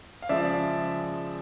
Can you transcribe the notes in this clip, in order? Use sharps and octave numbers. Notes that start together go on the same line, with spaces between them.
F5
C#3 F3 G#3 D5 E5